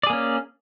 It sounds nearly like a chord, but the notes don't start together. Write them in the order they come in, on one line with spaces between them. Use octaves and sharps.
D5 G#4 A#3 C#4